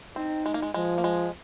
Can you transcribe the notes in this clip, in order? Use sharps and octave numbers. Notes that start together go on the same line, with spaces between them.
C4 D#4
G#3
A#3
G#3
F3 G#3
A#3
G#3